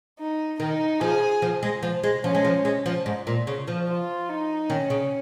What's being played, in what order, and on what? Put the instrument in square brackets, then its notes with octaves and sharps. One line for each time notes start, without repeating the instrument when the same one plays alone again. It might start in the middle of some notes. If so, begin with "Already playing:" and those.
[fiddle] D#4
[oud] D#3 [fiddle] D#4
[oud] F3 [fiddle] G#4
[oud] F3
G#3
F3
G#3
[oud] F3 [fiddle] C#4
[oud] G#3
F3
G#3
F3
G#2
A#2
C#3
F3
[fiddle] F4
D#4
[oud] D#3 [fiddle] C#4
[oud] C#3